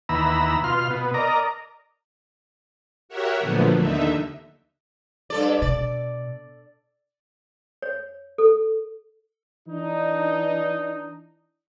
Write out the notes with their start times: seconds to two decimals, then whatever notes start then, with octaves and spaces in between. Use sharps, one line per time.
0.09 D#2 E3 B3 A#5 B5 E6
0.64 B2 F4 C6 F6
0.90 B2 B3
1.14 A#4 D5 D#5 A#5
3.09 F#4 G4 A#4 C#5 E5 F#5
3.39 A#2 D3 F3 F#3 A3 B3
3.74 D#2 D3 D#4 E5
5.30 G2 A4 D5
5.62 B2 D5
7.82 C#5
8.38 A4
9.66 E3 D4 D#4